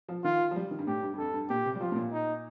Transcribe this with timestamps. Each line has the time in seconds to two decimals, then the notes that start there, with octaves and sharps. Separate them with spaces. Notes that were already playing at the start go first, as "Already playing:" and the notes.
0.09 F3
0.24 D#3 F4
0.51 F3
0.56 G3
0.71 D#3
0.79 G2
0.87 A2 G4
1.03 G2
1.14 G2
1.18 F2 A4
1.34 G2
1.49 A#2 G4
1.66 C3
1.75 G3
1.81 F3 F4
1.92 A2
1.96 A#2
2.12 D#4